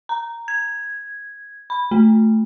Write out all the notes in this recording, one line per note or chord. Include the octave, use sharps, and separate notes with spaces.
A#5
G#6
B5
A3